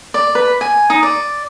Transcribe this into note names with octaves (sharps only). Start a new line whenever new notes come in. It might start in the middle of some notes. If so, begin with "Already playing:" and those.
D5
B4
G#5
D#4
D5